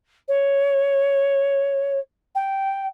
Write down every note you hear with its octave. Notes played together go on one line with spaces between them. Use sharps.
C#5
G5